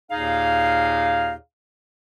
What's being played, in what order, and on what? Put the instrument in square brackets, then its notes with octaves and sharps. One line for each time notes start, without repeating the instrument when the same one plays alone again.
[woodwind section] D#2 A#2 D#4 G#4 F5